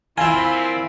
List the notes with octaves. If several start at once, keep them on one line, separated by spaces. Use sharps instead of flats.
A#2 C4 E4 F4 E5 G#5 B5